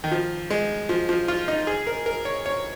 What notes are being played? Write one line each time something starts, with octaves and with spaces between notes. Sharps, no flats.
D#3
F3
G#3
F3
F3
F4
D#4
G#4
A#4
A#4
C#5
C#5